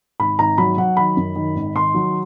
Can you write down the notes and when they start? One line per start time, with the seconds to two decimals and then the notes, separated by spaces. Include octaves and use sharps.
0.20 G#1 B5
0.39 G#1 A#5
0.58 F#3 B5
0.78 F#3 F#5
0.97 D#3 B5
1.17 F#2
1.36 D#3
1.55 G#1
1.76 D#3 C6
1.94 F#3